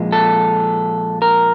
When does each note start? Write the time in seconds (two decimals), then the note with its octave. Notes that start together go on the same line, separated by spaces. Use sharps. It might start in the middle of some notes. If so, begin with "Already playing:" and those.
Already playing: A#2 F3 G#3
0.12 A4
1.22 A#4